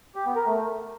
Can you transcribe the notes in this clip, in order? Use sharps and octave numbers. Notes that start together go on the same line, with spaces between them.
G4
B3
A#4
A3